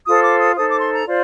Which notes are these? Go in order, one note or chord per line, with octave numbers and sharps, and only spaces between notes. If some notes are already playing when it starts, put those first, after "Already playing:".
F4 A4 C5 D#6
D6
D#6
D#4 A4 C5 D#6
D6
C6
A#5
F4 C5 D5